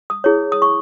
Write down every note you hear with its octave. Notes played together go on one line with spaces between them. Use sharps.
D#6
E4 G#4 C#5
D#6
C#6